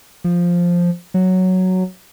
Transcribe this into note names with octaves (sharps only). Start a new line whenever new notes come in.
F3
F#3